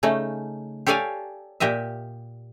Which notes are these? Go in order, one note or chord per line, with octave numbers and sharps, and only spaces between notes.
C#3 A3 C#4 D#4
G4 A4 C#5 D5 F5 G#5
A#2 G4 D#5 E5